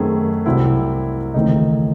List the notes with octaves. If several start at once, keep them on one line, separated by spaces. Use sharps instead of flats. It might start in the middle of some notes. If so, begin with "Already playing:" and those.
Already playing: F#2 D#3 A3 C4 G#4
C2 C3 F#3 C4 E4
D#2 C#3 E3 A3 C4 D#4